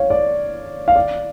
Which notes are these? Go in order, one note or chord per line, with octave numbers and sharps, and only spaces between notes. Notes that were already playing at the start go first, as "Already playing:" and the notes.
Already playing: C#5 F5
D5
F5
D5